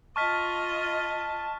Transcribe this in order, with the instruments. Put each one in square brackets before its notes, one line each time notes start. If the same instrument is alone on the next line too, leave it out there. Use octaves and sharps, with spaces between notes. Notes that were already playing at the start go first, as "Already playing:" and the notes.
[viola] F4 D#5 [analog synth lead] A5 [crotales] C#6 F6 B6